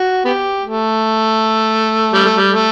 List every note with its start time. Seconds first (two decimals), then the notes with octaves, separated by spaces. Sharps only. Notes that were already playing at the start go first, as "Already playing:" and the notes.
Already playing: F#4
0.25 B3 G4
0.63 A3
2.13 G3
2.25 A3
2.37 G3
2.51 A3